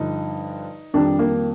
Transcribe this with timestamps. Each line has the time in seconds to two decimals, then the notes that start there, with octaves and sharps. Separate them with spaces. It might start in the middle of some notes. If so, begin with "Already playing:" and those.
Already playing: G2 D3 F3 D#4
0.94 F2 D#3 G3 D4
1.19 A#3